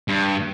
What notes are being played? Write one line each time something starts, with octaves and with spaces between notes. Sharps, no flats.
G2